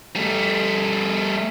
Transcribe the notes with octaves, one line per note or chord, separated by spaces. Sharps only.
G3 A3